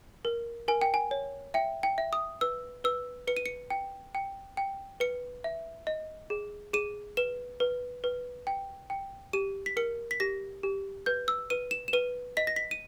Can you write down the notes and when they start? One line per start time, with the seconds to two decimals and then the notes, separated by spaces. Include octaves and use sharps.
0.25 A#4
0.68 A#4 G#5
0.81 G5
0.94 G#5
1.11 C#5
1.54 E5 G5
1.83 G5
1.98 E5
2.13 D#6
2.41 B4 E6
2.84 B4 E6
3.28 B4 C#7
3.37 D#7
3.46 C#7
3.70 G5
4.15 G5
4.57 G5
5.00 B4 C#7
5.44 E5
5.87 D#5
6.30 G#4
6.73 G#4 D#7
7.17 B4 E7
7.60 B4
8.04 B4
8.47 G5
8.90 G5
9.33 G4 D#7
9.66 B6
9.77 A#4 C#7
10.11 B6
10.20 G4 A#6
10.63 G4
11.06 B4 G6
11.28 E6
11.50 B4 D#7
11.71 E7
11.88 E7
11.93 B4 D#7
12.37 D#5 B6
12.47 A#6
12.56 B6
12.71 D#7